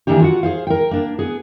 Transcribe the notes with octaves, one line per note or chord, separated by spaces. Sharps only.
D#3 E3 A#3 D4 G4
F4 F#4 F#5
G#4 C5 F5
A#4 G5
A#3 D4
B3 G#4